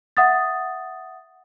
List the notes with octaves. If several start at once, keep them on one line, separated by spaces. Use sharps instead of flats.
E5 F#5 D#6 A6